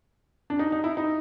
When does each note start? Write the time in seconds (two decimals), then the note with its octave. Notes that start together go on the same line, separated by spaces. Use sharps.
0.50 D4
0.59 D#4
0.72 D#4
0.84 E4
0.97 D#4